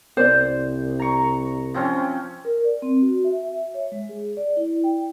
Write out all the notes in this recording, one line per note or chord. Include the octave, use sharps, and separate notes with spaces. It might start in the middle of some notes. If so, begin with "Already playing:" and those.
C2 C5 D5
A#5 C#6
F3 C4 C#4
A#4
D5
C4
F#4
E5
E5
C#5
G#3
G#4
D5
E4
G5